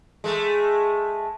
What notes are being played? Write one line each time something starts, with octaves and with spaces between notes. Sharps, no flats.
G#3 A3